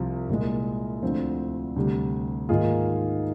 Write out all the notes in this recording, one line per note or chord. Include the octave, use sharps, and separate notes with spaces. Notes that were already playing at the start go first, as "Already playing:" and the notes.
Already playing: C2 C3 F3
C2 A#2 G#3
D2 D3 F3 C4
D2 C3 G3
G#2 D#3 A#3 F4 G#4